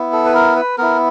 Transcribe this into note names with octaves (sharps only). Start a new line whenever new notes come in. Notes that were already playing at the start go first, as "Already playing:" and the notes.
Already playing: B3 E4
A4
B4
A#4
B4
B3 E4 A#4